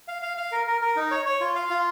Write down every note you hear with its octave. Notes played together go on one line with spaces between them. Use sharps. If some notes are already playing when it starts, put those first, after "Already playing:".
F5
F5
F5
A#4
A#4
A#4
D#4
C#5
C#5
F4
F5
F4